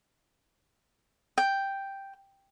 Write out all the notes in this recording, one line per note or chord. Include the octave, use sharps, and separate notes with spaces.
G5